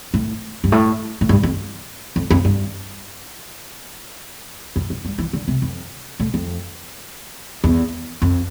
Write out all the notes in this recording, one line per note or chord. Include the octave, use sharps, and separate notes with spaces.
A2
G2
A2
A2
G2
F2
F2
F2
G2
F2
F2
G2
E3
D3
C3
F2
A2
F2
E2
F2